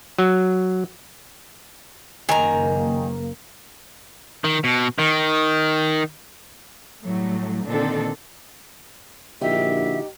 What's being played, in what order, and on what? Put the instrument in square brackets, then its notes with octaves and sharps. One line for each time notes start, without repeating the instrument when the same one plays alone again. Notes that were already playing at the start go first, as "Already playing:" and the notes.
[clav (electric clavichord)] F#3
[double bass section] F#1 A#3 [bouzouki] D#3 A#5 [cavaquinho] G#5
[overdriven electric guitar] D#3
B2
D#3
[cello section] A2 F#3 G3 A3
A#2 D3 D#3 C4 D4 A4
[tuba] A#1 [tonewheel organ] D3 E4 F#4 [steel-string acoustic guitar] D#4 G4 [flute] E5